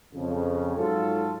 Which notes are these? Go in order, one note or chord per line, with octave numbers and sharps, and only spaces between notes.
F2 C#3
G#2 F#3 F4 A4